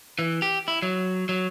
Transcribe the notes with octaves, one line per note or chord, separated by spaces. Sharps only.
E3
G4
E4
F#3
F#3